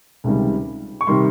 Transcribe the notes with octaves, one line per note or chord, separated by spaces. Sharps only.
C#2 C3 D#3 G3
C#6
C3 D#3 G3 C6